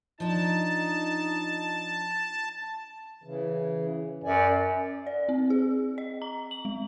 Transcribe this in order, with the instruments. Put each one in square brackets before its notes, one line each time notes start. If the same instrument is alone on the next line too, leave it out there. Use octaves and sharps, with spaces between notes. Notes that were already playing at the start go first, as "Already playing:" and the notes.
[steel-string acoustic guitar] F3 D4 [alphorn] D#4 [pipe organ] A5
[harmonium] C#3 E3
[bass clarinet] F#2 [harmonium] D5 G#5
[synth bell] D5
C4
G#4
D#5
A#5
F#7
G#3